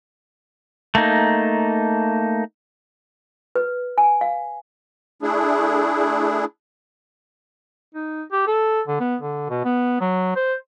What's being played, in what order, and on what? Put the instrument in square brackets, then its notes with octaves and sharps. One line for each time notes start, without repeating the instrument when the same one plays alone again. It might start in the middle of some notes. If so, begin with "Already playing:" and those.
[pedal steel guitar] A3 A#3 D#4
[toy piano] B4
G#5
F5
[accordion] A3 D4 E4 G#4
[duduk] D#4
G4
A4
D3
B3
D3
B2
B3
F#3
C5